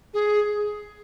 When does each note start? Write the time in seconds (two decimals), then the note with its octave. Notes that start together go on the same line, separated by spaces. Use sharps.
0.13 G#4